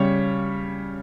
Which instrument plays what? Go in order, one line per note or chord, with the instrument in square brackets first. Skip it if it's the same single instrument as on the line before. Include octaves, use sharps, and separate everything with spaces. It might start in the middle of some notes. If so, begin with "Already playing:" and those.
Already playing: [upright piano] C#3 G3 C#5